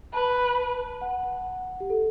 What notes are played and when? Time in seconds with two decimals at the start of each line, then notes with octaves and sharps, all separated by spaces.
0.13 B4 A5
1.01 F#5
1.80 G4
1.90 A4